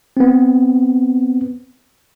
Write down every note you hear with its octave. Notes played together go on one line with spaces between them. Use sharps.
B3 C4